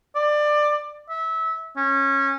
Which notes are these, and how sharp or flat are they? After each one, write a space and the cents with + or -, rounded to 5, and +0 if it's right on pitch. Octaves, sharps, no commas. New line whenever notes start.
D5 +20
E5 -20
C#4 -20